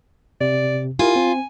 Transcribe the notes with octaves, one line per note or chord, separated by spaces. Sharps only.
C3 D5
E4 F4 G4 A#4 G#5
C4